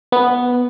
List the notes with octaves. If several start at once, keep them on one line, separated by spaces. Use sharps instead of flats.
B3